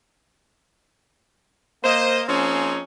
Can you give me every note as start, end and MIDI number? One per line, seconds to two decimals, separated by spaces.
1.84 2.21 58
1.84 2.21 72
1.84 2.21 75
2.27 2.79 53
2.27 2.79 58
2.27 2.79 60
2.27 2.79 61
2.27 2.79 63
2.27 2.79 68